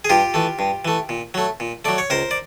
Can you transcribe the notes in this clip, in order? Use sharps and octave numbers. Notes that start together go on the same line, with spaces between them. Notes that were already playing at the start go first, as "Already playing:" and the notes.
G#4
G2 F4 G4
E3 A3
G2
E3 A3
A#2
F#3 A3
A#2
F#3 A3 D5
C#5
C#2 A#4 C5
D5